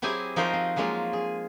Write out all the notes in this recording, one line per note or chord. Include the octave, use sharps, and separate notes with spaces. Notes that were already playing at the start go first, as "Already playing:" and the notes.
F#3 C4 E4 G4 G#4 G#5
F3 D#4 F#4 A#4 C5 D#5
C4
F3 F#3 G#3 A#3 F4
G#4